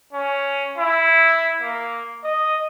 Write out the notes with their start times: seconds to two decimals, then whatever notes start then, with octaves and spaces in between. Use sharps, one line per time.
0.13 C#4
0.78 E4
1.61 A#3
2.23 D#5